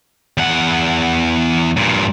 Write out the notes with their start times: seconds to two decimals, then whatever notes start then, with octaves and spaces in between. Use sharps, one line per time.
0.38 E2 F#5
1.77 G2 A#2